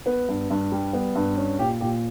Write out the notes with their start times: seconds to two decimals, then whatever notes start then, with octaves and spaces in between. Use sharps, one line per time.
0.06 B3 B4
0.28 G2
0.50 G2
0.72 G3
0.93 B3
1.15 G2
1.38 C#4
1.59 A#2 G4
1.81 A#2 G4